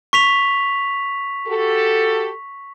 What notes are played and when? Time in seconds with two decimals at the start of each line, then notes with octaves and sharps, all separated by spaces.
0.13 C#6 B6 F7
1.48 F#4 G4 A4